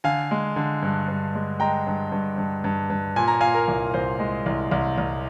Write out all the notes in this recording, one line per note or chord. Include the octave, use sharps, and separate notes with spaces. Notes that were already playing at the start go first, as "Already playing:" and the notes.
D3 F5 G#5
G#3
D3
G2
G2
G#3
G#3 G5 A#5
G2
G2
G2
G2
G2
A#2 G#5
A#5
A#2 F5 G#5
A#4
C2
C2 C5
G#3
C2
C2
C2